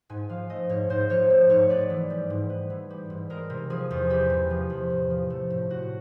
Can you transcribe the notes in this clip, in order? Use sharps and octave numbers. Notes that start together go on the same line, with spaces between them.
G#2 G#5
F3 F5
A3 D#5
G#2 C#5
G#2 C5
F3 C#5
A3
G#2 C#5
B3 D5
E3
G3
G#2
B3
E3
G3
G#2
G#3 A#4
C3
F3 G#4
E2
G#3 G4
C3
F3
E2
A2
F3
A3
A2
A2 F#4